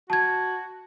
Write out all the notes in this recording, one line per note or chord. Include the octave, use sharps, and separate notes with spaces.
F#4 A5 G#6